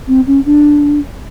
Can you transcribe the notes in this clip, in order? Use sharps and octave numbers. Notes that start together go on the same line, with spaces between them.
C4
C#4
D4